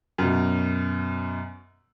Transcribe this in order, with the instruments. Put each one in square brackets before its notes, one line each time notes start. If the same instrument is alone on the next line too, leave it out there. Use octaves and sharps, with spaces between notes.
[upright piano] F#2 B2